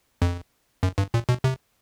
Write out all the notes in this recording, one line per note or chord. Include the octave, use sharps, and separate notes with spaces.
F2
F#2
G2
A#2
B2
C3